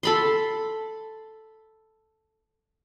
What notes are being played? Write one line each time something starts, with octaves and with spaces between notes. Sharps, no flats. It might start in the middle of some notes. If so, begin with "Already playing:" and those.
A4 B5 C6